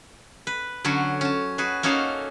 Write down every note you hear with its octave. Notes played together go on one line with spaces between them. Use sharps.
B4
D3 F#3 C#4 F#4
C#4 A5
F#4 G#4 B4
A#3 C#4 D#4 F#4 A4 F5